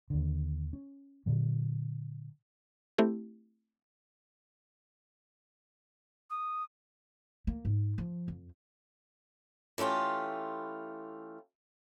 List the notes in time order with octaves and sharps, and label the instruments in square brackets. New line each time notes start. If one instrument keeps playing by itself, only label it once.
[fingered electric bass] D#2 D3
C#4
A#2 D3 F#3
[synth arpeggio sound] A3 C4 E4 G4
[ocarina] D#6
[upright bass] A#3
G#2
F3
F2
[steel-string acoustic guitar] E3 A3 C#4 F4 G4